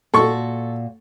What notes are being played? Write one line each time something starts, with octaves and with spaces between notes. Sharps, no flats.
A#2 F#4 A4 C#6